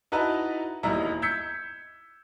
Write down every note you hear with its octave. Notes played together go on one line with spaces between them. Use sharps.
D#4 E4 F#4 B4 A5 A#5
E1 D#2 D#4 E4 A#5
E6 G6 G#6 B6 C#7